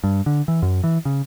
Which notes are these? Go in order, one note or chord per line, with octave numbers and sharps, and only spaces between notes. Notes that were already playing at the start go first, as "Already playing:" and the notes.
G2
D3
E3
F#2
E3
C#3